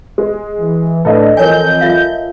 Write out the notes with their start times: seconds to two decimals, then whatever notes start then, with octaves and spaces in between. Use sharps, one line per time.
0.18 G#3
0.60 E3
1.05 A2 D4 A4 B4 D#5
1.37 F2 E3 A#4 C#5 G#5 G6
1.81 F4 E5 F5